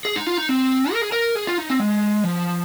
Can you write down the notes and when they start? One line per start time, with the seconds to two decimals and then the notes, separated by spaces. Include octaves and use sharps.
0.05 G#4
0.16 D#4
0.27 F4
0.38 D#4
0.49 C4
0.93 A#4
1.02 G#4
1.12 A#4
1.35 G#4
1.47 F4
1.58 D#4
1.70 C4
1.79 G#3
2.23 F3